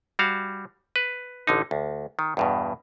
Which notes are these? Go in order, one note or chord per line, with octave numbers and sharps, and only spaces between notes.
G3 F#4 F5
B4
A1 D3 D#4
D2
D#3
E2 G2 B2